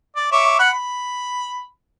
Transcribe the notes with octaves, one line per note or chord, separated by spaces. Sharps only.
D5
C#5 E5 D6
F#5 B5
B5